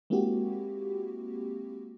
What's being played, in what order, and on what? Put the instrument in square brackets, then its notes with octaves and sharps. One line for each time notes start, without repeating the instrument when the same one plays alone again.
[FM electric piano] G#3 A#3 C4 E4 F#4 G4